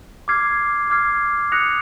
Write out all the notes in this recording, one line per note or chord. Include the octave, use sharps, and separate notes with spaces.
D6 F6 G#6 C7
D6 F6 G#6 C7
D#6 F#6 A#6 C#7 F7